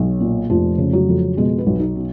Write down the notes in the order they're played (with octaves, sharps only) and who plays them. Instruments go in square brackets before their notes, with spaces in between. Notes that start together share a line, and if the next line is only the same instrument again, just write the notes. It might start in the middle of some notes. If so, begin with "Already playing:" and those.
Already playing: [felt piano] B1 F#3
A#2
F1 F3
C#3
F#3
F2
B2 G#3
B3
B1
D#4
B2